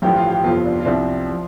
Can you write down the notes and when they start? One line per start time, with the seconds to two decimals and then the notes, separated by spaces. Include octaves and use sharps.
0.02 A1 G2 D3 F3 G4
0.16 F4
0.30 G4
0.44 G1 F2 C3 F3 F4
0.65 D4
0.80 F4
0.85 C2 C3 F3 D4
1.31 F3